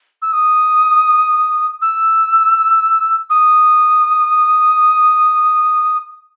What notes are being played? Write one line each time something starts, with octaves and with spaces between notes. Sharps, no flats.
E6
D#6
E6
D#6